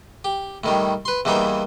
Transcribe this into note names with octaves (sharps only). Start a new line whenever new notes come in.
G4
A2 D#3 G3
B4 C6
E2 E3 G3 A#3 D#4 G5